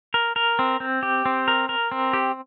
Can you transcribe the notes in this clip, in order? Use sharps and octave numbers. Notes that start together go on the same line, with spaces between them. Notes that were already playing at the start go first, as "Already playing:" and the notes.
A#4
A#4
C4
C4
G4
C4
A#4
A#4
C4
G4